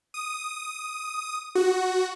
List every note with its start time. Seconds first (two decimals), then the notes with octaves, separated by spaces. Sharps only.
0.14 D#6
1.55 F#4